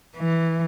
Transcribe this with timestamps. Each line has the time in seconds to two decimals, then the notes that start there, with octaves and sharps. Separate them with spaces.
0.17 E3